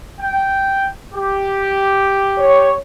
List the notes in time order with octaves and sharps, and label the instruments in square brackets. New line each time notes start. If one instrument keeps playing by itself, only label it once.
[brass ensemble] G5
G4
[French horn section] C#5